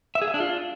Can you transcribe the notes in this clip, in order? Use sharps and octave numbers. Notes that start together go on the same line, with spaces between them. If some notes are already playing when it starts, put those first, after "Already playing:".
E5
G#4
E5
D4
F4